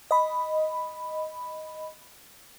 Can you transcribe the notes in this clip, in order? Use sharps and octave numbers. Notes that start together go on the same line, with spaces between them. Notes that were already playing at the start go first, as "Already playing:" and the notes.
D#5 B5